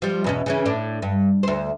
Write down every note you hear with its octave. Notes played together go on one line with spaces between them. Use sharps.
F3 G3
E2 B2 C#4
C#3 E3 C#4
A2 D4
G2
D2 C5